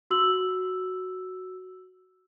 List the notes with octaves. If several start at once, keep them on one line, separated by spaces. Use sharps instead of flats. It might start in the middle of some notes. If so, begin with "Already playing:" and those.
F#4 E6 F#7